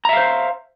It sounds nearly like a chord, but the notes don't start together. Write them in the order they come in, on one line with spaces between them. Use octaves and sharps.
A#5 E5 F5 C5